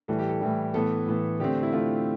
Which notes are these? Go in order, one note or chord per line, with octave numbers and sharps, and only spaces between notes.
A2 E3 G3 A4
G4
A4
A2 E3 G3
A2 E3 B3 A4
A2 E3 B3
D3 A3 C4 G4
E4
D3 A3 C4 F4